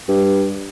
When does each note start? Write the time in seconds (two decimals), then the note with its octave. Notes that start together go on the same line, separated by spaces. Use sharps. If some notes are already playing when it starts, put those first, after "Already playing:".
0.09 G2